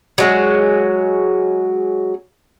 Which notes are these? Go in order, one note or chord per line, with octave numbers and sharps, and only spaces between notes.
F#3 G#3 C#4